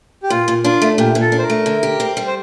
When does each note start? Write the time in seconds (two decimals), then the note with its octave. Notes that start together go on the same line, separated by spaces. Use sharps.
0.23 G4
0.30 A#2 F4
0.48 A#2
0.64 D4 F4
0.82 A3
0.98 A#2 G4
1.15 A#2
1.21 A4
1.32 D4
1.38 C5
1.43 A#4
1.50 A3
1.66 D3
1.83 G4
2.00 C4
2.17 G3
2.27 C5